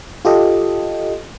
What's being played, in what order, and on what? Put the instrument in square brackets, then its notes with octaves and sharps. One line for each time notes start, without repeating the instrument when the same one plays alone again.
[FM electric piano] F4 G4 A4 D#5